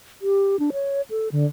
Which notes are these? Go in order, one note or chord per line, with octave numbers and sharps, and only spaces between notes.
G4
D4
C#5
A4
D3